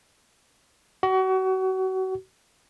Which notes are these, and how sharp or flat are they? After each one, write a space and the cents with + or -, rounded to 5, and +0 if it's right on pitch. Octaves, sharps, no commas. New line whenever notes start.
F#4 +30